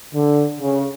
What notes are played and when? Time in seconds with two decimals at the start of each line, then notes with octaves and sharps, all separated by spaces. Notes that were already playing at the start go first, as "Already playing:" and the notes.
0.13 D3
0.60 C#3